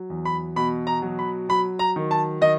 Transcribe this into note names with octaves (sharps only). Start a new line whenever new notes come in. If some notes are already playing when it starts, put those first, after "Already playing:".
Already playing: F#3
E2
B5
B2 B5
A#5
F#3
B5
F#3 B5
A#5
D#3
A5
D#3 D#5